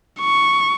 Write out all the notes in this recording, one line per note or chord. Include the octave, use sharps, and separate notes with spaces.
C#6